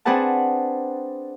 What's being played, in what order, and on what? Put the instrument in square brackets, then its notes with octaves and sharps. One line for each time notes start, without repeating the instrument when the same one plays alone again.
[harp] C4 D4 G#4 B4 F#5 A5